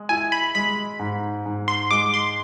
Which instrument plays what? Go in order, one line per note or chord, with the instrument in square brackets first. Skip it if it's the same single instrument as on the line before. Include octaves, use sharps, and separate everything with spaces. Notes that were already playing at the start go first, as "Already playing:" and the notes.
Already playing: [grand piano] G#3
[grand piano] E4 [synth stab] G#5
[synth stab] B5
[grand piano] G#3 [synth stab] B5
[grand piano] G#2
G#2
[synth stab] C6
[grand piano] G#3 [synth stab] D6
[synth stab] C6